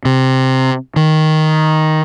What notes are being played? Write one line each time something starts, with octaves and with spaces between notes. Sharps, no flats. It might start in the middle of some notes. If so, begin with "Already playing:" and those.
C3
D#3